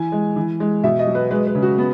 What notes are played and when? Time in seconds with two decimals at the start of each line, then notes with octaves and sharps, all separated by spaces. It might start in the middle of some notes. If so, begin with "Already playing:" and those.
Already playing: E3 G#5
0.12 G#3
0.36 E3
0.60 G#3
0.84 B2 E5
0.99 D#5
1.07 F#3
1.15 B4
1.31 G#3 B4
1.47 B4
1.55 C#3
1.63 F#4
1.78 B3